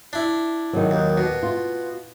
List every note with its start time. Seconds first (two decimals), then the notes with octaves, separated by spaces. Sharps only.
0.13 D4 E4
0.73 D#3 F#3
0.91 D#2
1.18 B2
1.43 F4